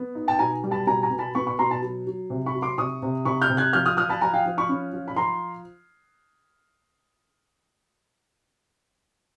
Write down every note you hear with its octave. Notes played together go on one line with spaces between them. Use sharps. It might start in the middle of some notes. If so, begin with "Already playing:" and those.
Already playing: B3
D#4
G5 A5
B2 G#5 A#5
G3
A5 B5
B2 G#5 A#5
G#5 A#5
B2
A5 B5
B3 B5 C#6
B5 C#6
B2 A#5 C6
A5 B5
F#3
F#3
C3
B5 C#6
F#3
C6 D6
C3 C#6 D#6
C3
C3 B5 C#6
F6 G6
C3
F#6 G#6
F3 F6 G6
D#6 F6
F3 D#6 F6
A5 B5
F3 G#5 A#5
F5 G5
F3
B5 C#6
C#4
F3
B5
F3 A#5 C6